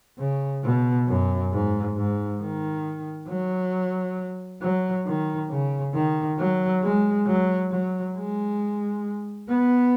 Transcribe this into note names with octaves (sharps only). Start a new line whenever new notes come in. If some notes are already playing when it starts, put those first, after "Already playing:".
C#3
B2
F#2
G#2
G#2
D#3
F#3
F#3
D#3
C#3
D#3
F#3
G#3
F#3
F#3
G#3
B3